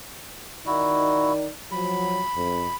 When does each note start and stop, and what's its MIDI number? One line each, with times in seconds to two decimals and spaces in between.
0.66 1.49 51
0.66 1.49 63
0.66 1.33 64
0.66 1.33 66
0.66 1.49 74
1.72 2.20 53
1.72 2.20 54
1.72 2.76 83
2.35 2.66 41